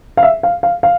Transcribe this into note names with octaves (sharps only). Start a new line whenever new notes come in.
F5
E5
F5
F5
F5